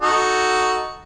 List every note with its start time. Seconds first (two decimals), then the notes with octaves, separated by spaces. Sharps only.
0.02 D#4 F#4 A4